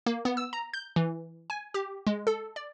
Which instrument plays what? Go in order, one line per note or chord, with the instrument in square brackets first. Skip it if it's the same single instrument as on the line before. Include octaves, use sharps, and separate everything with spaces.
[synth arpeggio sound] A#3
B3
E6
A#5
G6
E3
G#5
G4
G#3
A4
D5